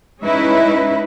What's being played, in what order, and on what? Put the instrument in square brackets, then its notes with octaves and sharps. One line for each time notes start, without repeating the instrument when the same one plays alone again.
[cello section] G#3 C#4 D#4 E4 B4 E5